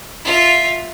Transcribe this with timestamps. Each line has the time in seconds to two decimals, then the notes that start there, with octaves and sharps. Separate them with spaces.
0.24 F4 E5